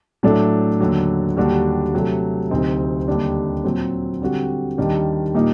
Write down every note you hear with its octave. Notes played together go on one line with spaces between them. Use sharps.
A2 F#3 A3 D4 A4
D#2 D3 F#3
D#2 D3 G3 D4 F#4
C3 F#3 A3
D2 C3 F#3 C4 D#4
D#2 D3 G3 D4
A#2 F#3 C4
D3 G3 C4 F#4
D#2 D#3 G3 A#3 D4
A#2 G3 A#3 D#4